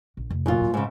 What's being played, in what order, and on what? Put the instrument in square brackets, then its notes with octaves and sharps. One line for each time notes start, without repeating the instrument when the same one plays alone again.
[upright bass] A#1
F1
[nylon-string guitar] F#2 A#2 F4
[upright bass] F2 A2
[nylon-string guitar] G#2 C#3